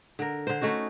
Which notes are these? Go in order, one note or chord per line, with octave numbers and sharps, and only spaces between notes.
D3 A#4
D3 C5
A3 C#4 D#4 F#4